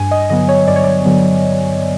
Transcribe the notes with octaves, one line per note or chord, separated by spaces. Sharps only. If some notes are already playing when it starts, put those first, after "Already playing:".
Already playing: G2 G#5
D#5
D3 F#3 B3 D#5
C#5
G2 D5
C#5
D5
D3 F#3 B3